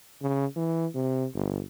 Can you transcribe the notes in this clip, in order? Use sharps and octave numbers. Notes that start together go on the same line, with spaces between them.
C#3
E3
C3
G1